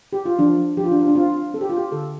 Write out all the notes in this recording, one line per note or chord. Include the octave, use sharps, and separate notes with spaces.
G4
F4
F3 D4
F3 G4
F4
D4
F4
D4
C4 F4
C4 A4
G4
F4
G4
D3 A4